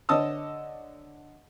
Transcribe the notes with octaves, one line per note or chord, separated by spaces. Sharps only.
D3 C#5 D#5 A5 D#6 E6